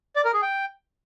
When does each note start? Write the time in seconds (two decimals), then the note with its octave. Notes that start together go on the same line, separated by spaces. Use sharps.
0.16 D5
0.25 A#4
0.33 G#4
0.42 G5